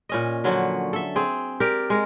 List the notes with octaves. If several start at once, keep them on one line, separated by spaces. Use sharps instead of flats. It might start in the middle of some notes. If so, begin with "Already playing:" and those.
A#2 C#4 D#5
D3 F3 F#3 C#4
A4 E5
C4 G#4
G4 A#4 D5
G#3 A#4